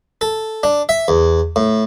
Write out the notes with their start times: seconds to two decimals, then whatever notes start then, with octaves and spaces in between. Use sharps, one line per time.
0.21 A4
0.63 D4
0.89 E5
1.08 E2
1.56 A2